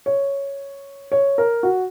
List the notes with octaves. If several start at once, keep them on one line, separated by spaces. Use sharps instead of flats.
C#5
C#5
A#4
F#4